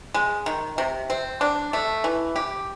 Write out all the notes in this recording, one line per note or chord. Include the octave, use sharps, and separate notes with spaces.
G#3
D#3
C3
C4
D4
A3
E3
G4